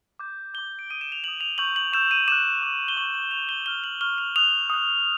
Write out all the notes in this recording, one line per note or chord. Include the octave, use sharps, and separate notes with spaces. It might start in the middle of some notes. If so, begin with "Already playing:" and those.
D6 G6
D6 G6 G7
D7
D#6 G6 D#7
E7
F7
D#6 G6 F#7
F7
C#6 E6 G6 F#7
F#7
C#6 E6 G6 E7
D#7
D6 F#6 E7
D6 F#6
G7
C#6 F#6 F#7
F#7
C#6 F#6 F7
G7
C#6 F6 G7
F#7
C#6 F6 G7
F7
D#6 F#6 F7
D#6 F#6